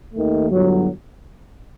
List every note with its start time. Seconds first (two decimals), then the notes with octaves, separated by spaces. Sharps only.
0.13 D#2 D#3 A3
0.50 G1 G2 F#3